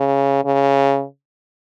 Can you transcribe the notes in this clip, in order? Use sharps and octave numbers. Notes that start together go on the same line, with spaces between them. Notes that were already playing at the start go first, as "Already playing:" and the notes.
Already playing: C#3
C#3